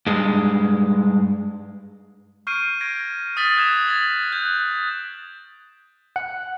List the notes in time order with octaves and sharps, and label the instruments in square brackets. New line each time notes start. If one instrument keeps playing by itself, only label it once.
[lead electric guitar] G2 G#3
[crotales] C#6 F6 G6 C7 D7 D#7
G6 G#6 A#6 D7
D#6 F6 A6 B6 F#7
D#6 F#6 G#6 A6 E7 F7
G#6 A6 F#7
F#6 G6
[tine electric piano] F#5